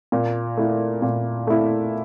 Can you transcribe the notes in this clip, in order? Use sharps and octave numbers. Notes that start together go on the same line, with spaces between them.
A#2
A3 E4
A#2
A3 E4